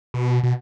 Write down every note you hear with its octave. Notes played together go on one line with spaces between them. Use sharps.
B2
B2